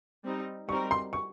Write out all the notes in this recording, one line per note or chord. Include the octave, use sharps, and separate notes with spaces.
G3 C4 D#4
G3 C4 D#4 A#4 C#6
C6
C#6